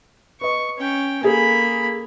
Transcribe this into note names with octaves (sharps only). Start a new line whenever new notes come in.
B4 D#5 C#6
C#4 G5
A#3 G#4 A4 G#5 B5